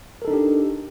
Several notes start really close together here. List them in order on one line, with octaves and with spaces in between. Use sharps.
A#4 A4 D#4 D4 G4